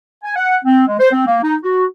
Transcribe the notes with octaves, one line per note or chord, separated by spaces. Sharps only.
G#5
F#5
C4
G#3
C5
C4
A#3
D#4
F#4